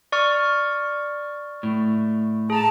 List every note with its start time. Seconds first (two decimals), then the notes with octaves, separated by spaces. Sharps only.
0.12 D5 C#6 F6
1.63 A2
2.50 G#4 A5 A#5